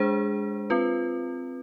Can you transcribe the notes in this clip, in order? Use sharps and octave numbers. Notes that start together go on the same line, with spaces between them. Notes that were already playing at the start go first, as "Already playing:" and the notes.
Already playing: G#3 D4 G#4 C5
C4 F4 B4